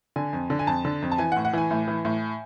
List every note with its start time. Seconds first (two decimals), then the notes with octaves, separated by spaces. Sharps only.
0.16 D3 G#5
0.33 F2
0.50 D3
0.59 G#5
0.67 F2 A5
0.85 D3
1.02 F2
1.12 A5
1.18 E3 G#5
1.32 F#5
1.36 A2
1.45 F#5
1.53 E3 G#5
1.71 A2
1.88 E3
2.05 A2